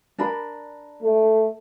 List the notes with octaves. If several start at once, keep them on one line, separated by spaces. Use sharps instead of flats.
D4 A#4 B5
A3